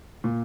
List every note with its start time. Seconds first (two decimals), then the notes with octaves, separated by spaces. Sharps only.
0.24 A#2